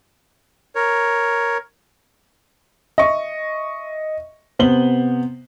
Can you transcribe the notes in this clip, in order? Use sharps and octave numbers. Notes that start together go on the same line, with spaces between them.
A#4 C#5
D#5 E5 C#6
C3 B3 C5 F#7 G7